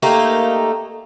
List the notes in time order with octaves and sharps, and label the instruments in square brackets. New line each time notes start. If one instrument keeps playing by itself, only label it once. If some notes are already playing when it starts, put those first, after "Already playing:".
[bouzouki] A3 A#3 D#4 G4